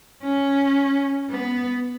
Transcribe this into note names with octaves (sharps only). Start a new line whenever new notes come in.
C#4
B3